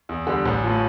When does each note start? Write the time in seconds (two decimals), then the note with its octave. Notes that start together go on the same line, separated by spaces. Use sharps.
0.09 E2
0.27 D3 G3
0.46 A1
0.64 A2 F3